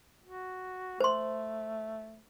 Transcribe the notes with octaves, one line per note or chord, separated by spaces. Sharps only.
F#4
A3 C5 C6